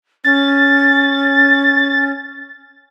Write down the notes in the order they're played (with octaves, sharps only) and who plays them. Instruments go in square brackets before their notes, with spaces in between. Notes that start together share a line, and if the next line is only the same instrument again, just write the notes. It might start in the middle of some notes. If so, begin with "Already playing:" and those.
[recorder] C#4 [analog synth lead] A6